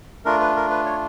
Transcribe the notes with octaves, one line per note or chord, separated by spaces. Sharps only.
A3 D4 F4 A#4
B4
A#4
B4
C#5